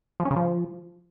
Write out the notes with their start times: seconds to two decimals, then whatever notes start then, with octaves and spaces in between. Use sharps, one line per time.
0.20 F3
0.25 C#4
0.31 C#3
0.36 F3